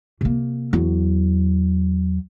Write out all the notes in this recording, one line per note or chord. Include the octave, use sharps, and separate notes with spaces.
C3 A#3
E2 F#3